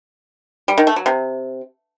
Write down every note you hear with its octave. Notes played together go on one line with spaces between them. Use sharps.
G3
D#3
A3
F#3
C3